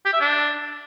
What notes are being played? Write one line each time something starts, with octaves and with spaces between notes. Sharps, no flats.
G4
E5
D4